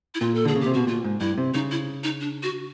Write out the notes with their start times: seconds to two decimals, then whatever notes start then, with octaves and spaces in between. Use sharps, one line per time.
0.15 E4
0.20 A#2 F4
0.34 A4
0.45 D3 G#4
0.56 C#3
0.61 G4
0.66 C3
0.74 B2 F#4
0.87 A#2 F4
1.04 G#2
1.21 G2 E4
1.38 C3
1.54 C#3 D#4
1.71 E4
2.04 D#4
2.21 D4
2.43 F#4